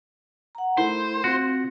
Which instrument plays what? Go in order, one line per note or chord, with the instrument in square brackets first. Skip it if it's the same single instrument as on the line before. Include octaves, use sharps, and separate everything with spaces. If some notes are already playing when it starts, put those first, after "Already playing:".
[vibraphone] F#5 A#5
[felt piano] A3 E4 [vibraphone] A#4 [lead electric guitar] C5
[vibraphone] C4 [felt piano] F4 [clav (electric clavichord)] F#4